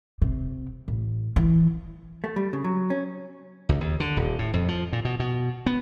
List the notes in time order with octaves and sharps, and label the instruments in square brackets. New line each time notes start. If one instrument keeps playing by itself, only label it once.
[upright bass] C3
A1
E3
[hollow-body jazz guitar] A3
G3
C#3
F#3
C#4
[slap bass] C#2
D#2
D3
D#1
A2
F2
F3
A#2
B2
B2
B3